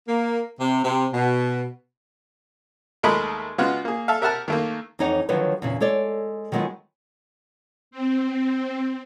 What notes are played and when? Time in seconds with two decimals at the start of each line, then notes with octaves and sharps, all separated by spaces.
0.08 A#3
0.59 C3
0.84 C3
1.13 B2
3.03 D#2 G#3 A3 A#4 D#5 B5
3.58 C#3 G#3 B3 F4 F#4
3.85 A#3 G#4
4.08 A4 E5 F5
4.21 G4 A#4 E5 F#5 A5 F6
4.48 D#3 A3 A#3
4.99 F2 E3 D#4 C#5 F#5
5.29 D3 D#3 F3 F#3 B4 C#5
5.62 E2 A#2 C#3
5.80 G#3 A4 C#5 D5
6.52 D#3 F#3 G#3 B3 F4
7.91 C4